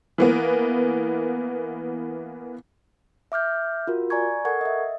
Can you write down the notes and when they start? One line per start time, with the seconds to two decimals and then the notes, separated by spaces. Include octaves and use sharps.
0.18 E3 A#3 B3
3.32 E5 D6 F6 G6
3.87 F4 F#4 A#4
4.10 D5 G#5 A#5 C#6 G#6
4.45 A4 A#4 F#5 C#6 G#6
4.61 D#5 E5